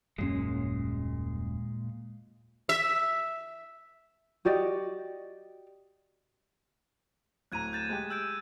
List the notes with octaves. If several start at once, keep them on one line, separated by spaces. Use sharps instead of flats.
D#1 F#2 A#2 G#3 C#4
E5
F#4 G4 D5 D#5
D1 A2 A#5 F#6 G#6 D#7
G6 A6 E7
G#3 G4
E6 G6 D7